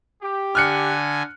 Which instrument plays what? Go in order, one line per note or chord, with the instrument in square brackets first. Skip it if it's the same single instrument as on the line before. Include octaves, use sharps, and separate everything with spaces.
[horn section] G4
[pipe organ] D3 G#5 [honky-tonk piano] F6 F#6 C#7